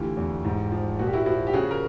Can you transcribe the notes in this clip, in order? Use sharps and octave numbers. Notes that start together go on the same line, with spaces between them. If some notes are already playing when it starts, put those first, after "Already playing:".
Already playing: D2 E3 F4 G4
E2
G#2
F3
A#2 F#4
G4
E4 F#4
F3 E4 F#4
G4
C#3 F#4 G#4
A#4